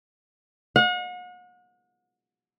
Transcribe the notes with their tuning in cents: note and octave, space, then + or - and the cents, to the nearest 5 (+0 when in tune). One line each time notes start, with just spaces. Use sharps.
F#5 -40